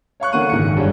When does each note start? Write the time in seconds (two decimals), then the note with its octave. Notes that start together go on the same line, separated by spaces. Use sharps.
0.20 C#5 F5 C#6 F#6
0.32 D3 E3 A#3 F#5 F#6 D#7
0.49 F#1 G#2 D#3 C#7
0.76 D1 G2 D4 G#4 C#5